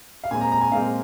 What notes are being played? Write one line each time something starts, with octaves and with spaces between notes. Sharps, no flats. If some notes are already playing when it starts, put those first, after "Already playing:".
F5
A#2 G#3 C4 G#5
A#5
A#5
G#5
A#2 G#3 C4 F5